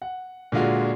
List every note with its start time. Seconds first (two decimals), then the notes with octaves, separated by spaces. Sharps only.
0.02 F#5
0.52 A#2 D3 G#3 F4 F#4